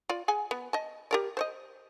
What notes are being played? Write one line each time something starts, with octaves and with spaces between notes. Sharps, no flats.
F4 D5
G#4 F#5 G#5
B3
D#5 A5
G4 A#4 D5
C5 C#5 D#5